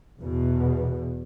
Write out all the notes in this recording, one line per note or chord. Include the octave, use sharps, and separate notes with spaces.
E2 B2